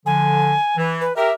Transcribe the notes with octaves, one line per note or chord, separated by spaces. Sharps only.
D3 F3 G#5
E3
B4
G4 A#4 E5